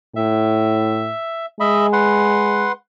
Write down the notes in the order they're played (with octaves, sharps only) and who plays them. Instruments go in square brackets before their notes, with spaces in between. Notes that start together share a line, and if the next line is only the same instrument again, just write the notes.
[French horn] A2 [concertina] E5
[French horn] G#3 [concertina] D#5 E5 B5
[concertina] B4 F#5 C6